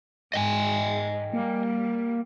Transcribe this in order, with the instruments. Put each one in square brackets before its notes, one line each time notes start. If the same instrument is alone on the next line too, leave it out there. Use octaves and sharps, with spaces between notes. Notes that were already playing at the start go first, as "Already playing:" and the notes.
[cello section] G#2 [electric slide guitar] D#5 G5 G#5
[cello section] G3 [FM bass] A#3